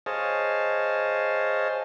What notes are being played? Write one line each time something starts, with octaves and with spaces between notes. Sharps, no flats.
G#4 C5 C#5 D#5 F5 A5